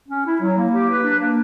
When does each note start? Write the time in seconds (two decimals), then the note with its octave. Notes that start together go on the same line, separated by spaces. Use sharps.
0.09 C#4
0.25 E4
0.41 F#3
0.57 A#3
0.73 G4
0.89 B4
1.04 D4
1.20 A#3